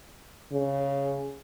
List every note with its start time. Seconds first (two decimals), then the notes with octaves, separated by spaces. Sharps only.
0.52 C#3